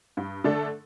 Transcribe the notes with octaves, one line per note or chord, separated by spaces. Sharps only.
G2
D3 A3 D4 A4